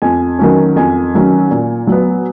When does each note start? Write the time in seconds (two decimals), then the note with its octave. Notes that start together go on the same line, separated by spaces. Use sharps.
0.02 F2 G#5
0.39 D#3 F#3 C#4
0.76 F2 G#5
1.14 D#3 F#3 C#4
1.51 A#2
1.87 F#3 B3